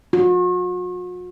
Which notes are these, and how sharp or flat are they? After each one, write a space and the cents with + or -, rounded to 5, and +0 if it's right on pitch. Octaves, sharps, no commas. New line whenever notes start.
F#4 -45